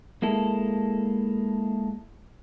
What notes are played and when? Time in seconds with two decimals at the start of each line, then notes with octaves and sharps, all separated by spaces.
0.22 G#3 A#3 E4 A4